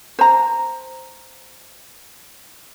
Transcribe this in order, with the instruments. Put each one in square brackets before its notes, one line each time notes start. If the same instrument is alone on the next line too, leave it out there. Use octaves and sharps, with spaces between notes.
[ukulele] C5 A#5